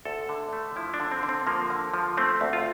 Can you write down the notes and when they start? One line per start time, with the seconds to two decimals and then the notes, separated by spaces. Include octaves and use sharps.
0.05 D2 A4
0.29 D3
0.53 A3
0.76 F3 E4
0.94 D4
1.00 D3
1.11 C4
1.23 D3
1.29 C4
1.47 F3 A#3
1.70 D3
1.94 F3
2.17 A3 C4
2.41 D2
2.53 F4